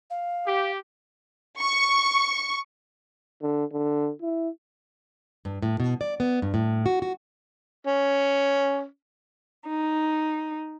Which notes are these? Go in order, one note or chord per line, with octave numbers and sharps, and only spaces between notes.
F5
G4
C#6
D3
D3
E4
G2
A2
B2
D5
B3
G2
A2
F#4
F#4
C#4
D#4